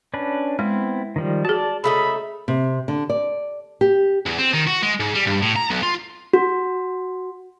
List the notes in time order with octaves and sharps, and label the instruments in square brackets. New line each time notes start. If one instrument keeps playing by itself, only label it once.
[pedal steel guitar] C#4 D4 B4
[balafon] G#3 [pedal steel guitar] B3 C4 E4
[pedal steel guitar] D#3 F3 G3
[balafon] F#4 G#4 [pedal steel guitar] D5 A5
[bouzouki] C#3 A3 D#4 [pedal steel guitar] E5 [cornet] B5
[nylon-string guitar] C3
D3
D5
G4
[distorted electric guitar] E2
C4
D#3
F#4
G#3
G#2
G3
G2
A2
A#5
B1
F4
[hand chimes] F#4